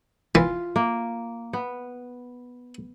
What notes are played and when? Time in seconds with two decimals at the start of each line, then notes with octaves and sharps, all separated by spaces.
0.35 E3 F4
0.76 A#3
1.53 B3